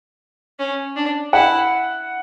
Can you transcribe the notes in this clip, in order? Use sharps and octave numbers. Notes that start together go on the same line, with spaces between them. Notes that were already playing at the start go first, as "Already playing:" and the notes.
C#4
D4
E4 F#5